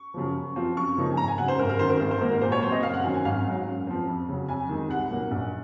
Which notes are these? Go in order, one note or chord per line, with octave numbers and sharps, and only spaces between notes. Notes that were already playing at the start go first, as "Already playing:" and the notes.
Already playing: C#6
F#2 C#3 F3
F#2
F3 C4 F4
F#2 C#6
C#3 F3 A#3 D#4
G#5
G#1 A#5
G#5
F#2 C#3 F#5
C5
G#1 A#4
A#4
F#2 D#3 C5
A#4
G#1 A#4
C5
G#2 D#3 A#3 A#4
A#4
A#2 C5
C#5
F#3 C4 C5
D#5
F#1 F5
F#5
F#2 D#3 F#3 C4 G#5
G#5
G#1 F5
G#2 F#3
F#2
F3 C4
F2
C#3 F#3
F2 G#5
D#3 G#3 D#4
C2 F#5
A#2 F#3 A#3
A#1